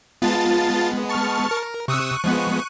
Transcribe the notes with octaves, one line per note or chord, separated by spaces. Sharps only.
G#3 B3 F4 A5 A6
A5 C#6 F6
A#4
C3 C#6 D#6 E6 F#6 D#7
F3 G#3 B3